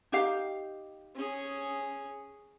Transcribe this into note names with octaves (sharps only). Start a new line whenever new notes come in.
D#4 G4 F5
C#4 G#4